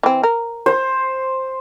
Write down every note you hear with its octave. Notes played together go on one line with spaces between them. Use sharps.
E3 C4
A#4
C5